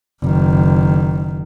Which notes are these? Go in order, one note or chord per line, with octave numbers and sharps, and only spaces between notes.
F#1 D#3